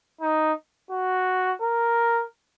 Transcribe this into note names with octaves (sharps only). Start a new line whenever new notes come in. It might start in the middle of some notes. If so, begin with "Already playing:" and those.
D#4
F#4
A#4